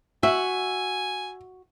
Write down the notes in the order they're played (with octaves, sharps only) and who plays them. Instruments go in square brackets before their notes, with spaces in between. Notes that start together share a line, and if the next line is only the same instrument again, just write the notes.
[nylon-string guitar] F#4 [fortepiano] E5 [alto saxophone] G#5